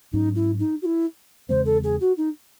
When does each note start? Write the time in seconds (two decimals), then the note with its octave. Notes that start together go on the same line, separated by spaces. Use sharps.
0.13 G#2 F#3 C#4 D#4
0.36 E4
0.59 D#4
0.82 F#4
0.85 E4
1.49 E2 C#3 G#3 C4 C5
1.66 A4
1.84 G#4
2.01 F#4
2.17 D#4